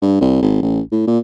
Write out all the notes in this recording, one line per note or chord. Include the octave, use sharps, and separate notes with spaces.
G2
C2
G#1
A1
A2
A#2